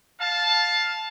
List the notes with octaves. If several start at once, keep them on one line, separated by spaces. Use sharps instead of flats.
F5 A5